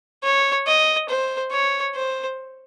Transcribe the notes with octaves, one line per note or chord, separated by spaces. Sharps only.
C#5
D#5
C5
C#5
C5